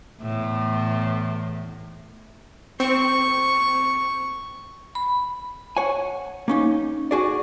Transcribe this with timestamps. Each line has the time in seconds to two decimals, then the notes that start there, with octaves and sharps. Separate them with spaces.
0.21 E2 A2
2.80 C4 C#6
4.95 B5
5.77 C#5 F#5 G#5
6.48 A#3 C#4 D#4
7.11 F#4 G#4 D5